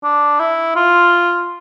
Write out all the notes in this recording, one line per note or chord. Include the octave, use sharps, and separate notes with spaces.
D4
E4
F4